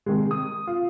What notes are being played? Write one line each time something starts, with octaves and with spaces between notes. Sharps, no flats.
C3 D#3 G#3
D#6
F4